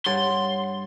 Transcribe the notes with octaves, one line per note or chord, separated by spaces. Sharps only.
G2 C#5 F#5 C6 A6